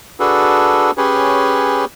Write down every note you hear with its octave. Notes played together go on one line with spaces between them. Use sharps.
D4 F#4 G#4 A4 B4
C#4 G4 G#4 B4 C#5